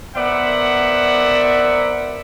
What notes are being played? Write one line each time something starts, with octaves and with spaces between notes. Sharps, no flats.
B3 A#4 C5 D5 E5 F#5